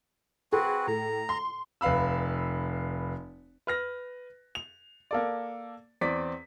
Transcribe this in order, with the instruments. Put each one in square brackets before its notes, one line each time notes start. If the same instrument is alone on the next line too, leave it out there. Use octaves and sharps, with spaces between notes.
[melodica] C4 F#4 B4 [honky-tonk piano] G#4
[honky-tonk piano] A2 [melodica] A#5
[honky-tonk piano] C6
[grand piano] F1 B4 F5 B5 E6
[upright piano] B4 F6 A#6
F7
A#3 A4 D5
E2 C4 D5 B6